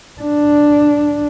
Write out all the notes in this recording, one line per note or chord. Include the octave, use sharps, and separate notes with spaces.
D4